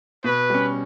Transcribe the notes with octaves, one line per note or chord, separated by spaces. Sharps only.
B2 B4
G3 C#4